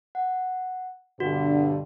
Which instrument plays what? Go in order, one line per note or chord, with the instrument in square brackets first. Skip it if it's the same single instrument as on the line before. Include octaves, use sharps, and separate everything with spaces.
[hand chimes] F#5
[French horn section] G2 B2 D3 [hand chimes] F#4